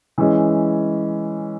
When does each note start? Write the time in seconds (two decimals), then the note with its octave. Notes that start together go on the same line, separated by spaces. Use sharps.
0.18 E3 G#3 C#4